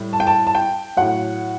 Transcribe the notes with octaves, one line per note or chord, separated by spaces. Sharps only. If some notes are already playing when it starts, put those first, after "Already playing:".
Already playing: A2 G3
A5
G5
A5
A5
G5
A2 F#3 F#5